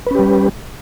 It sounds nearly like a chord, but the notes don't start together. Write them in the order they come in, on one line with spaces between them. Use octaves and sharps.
B4 C#4 G4 G3